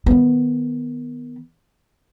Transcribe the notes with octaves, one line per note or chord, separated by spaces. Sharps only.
D#3 B3